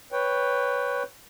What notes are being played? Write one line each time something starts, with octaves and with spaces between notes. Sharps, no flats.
B4 C#5 G5